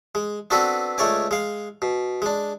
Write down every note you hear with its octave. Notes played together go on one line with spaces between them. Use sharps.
G#3
B3 C4 D4 F#4 A4 B4
C#2 A3 C#5 D5 G#5
G#3 F5
B2
G#3 D4